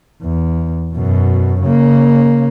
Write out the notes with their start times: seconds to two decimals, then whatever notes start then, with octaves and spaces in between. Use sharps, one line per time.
0.22 E2
0.94 F#2 B2
1.62 C#3 A#3